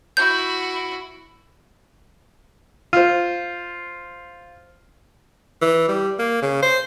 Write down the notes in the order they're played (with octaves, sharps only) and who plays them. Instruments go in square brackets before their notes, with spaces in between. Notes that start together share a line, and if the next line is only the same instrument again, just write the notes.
[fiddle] E4 F#4 [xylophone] G6
[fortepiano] F4 C5
[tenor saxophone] E3
G3
A#3
C#3
C5